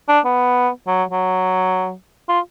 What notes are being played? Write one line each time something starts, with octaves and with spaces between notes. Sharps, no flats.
D4
B3
F#3
F#3
F4